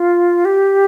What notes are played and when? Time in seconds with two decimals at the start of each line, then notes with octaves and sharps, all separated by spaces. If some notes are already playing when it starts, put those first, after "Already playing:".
Already playing: F4
0.45 G4